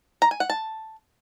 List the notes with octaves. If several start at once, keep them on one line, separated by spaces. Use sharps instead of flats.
A#5
G#5
F#5
A5